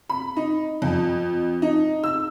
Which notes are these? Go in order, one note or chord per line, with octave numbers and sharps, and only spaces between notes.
B5
D#4
F2
D#4
E6